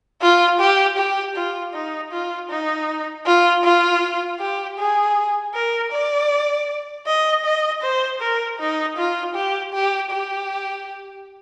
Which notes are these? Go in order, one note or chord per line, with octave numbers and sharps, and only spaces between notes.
F4
G4
G4
F4
D#4
F4
D#4
F4
F4
G4
G#4
A#4
D5
D#5
D#5
C5
A#4
D#4
F4
G4
G4
G4